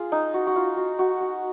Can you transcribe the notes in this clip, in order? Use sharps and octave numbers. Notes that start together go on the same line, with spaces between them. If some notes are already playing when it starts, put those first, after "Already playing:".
Already playing: F4 G#4
D#4
F#4
F#4
F4
F#4
F#4
F#4